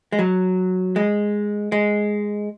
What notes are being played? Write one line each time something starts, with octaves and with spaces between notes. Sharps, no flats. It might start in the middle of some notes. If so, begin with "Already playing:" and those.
G#3
F#3
G#3
G#3